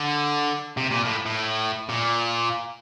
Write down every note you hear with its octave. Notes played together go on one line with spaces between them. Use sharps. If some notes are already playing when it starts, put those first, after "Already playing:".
Already playing: D3
C3
A#2
A2
A2
A#2